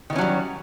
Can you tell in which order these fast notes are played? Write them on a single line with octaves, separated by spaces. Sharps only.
D#3 E3 C#4 F#3 G3